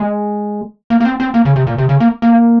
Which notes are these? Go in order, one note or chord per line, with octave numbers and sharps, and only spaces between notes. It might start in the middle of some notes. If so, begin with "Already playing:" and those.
Already playing: G#3
A#3
A#3
C4
C4
A#3
C#3
C3
A#2
C3
C#3
A#3
A#3